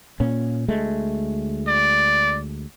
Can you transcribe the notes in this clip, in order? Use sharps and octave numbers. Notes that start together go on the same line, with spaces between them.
A#2 C#4
D2 G#3 A3
D5